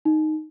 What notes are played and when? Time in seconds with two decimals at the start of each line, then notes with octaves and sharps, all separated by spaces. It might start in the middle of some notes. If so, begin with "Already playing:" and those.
0.05 D#4